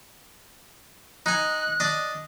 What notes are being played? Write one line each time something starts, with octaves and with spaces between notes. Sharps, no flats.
D#4 G#5 F#6
D4 D#5